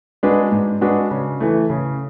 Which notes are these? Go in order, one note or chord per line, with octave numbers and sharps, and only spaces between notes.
G#3 D4 F#4 B4
G#2
G#3 D4 F#4 B4
C#3
E3 A3
C#3